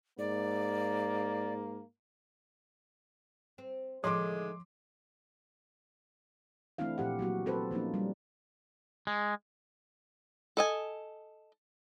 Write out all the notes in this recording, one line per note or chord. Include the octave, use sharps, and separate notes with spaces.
G#2 A#3 D5
C4
A2 D3 D#3 F3 G#3 C6 D6
E3 A3 C4 D4 E4 F5
A#2 F3 G4 F#5
F#3 A#3 F#4
C4 A4 B4 C5
F3 A#3 C#4 D#4
G3
G#3
A4 D#5 G#5